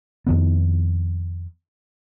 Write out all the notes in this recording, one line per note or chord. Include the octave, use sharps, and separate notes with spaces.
F2 D#3 B3